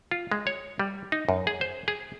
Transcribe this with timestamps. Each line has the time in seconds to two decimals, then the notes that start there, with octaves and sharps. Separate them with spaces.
0.11 F4
0.32 G#3
0.47 C#5
0.80 G3
1.12 D#4
1.29 F#2
1.47 G#4
1.61 C5
1.88 G#4